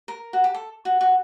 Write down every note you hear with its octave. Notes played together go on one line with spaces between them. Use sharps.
A#4
F#4
G4
A4
F#4
F#4